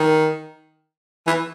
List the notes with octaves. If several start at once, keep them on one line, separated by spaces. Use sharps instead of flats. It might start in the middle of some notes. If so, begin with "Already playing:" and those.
Already playing: D#3
E3